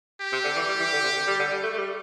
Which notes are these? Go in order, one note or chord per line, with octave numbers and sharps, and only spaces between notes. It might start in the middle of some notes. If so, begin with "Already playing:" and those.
G4
C3
D3
E3
G3
E3
D3
C3
D3
G3
D3
G3
A3
A3
G3